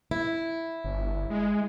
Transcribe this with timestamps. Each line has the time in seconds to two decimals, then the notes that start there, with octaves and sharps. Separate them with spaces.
0.11 E4
0.84 G1
1.30 G#3